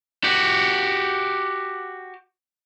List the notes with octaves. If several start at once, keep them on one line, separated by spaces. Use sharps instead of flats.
F#4 G4